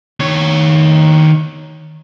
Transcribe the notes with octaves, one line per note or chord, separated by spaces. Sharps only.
D#3 C#5